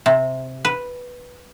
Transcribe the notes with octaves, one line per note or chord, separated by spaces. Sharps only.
C3
B4